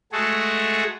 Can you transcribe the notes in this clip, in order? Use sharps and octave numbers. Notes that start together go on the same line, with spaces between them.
G#3 A3 F#4 G#4 A4